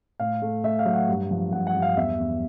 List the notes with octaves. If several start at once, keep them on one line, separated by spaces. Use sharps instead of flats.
A2 F5
A3
A3 E5
F5
F#3
F#5
G2
F3
G2 F#5
F#5
G2
F5
E2 E5
E2